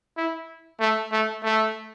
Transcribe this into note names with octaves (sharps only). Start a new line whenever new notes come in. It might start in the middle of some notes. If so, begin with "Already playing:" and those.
E4
A3
A3
A3